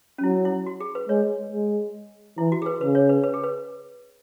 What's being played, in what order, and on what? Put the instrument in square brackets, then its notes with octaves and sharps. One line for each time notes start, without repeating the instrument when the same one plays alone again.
[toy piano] C#4
[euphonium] F#3 [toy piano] E4
[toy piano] E4
F#4
G#4
B4
[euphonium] G#3 [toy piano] C#5
[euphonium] G#3
[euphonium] E3 [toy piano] E4
[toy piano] F#4
G#4
B4
[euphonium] C#3 [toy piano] B4
[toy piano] C#5
B4
B4
G#4
B4